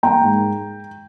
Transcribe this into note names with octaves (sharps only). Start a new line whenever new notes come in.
A#3 G5 A#5
G#2